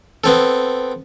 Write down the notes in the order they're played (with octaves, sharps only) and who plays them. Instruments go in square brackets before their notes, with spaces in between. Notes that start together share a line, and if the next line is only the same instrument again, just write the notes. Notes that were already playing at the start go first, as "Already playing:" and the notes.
[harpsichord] B3 C4 A4